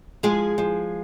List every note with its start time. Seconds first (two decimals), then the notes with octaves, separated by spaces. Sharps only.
0.23 F3 G#3 G#4
0.58 F3